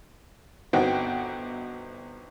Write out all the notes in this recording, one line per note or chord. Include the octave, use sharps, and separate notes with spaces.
G1 B3 C4 D#4 F#4 G5